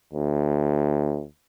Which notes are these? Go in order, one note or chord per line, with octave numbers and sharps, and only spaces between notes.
D2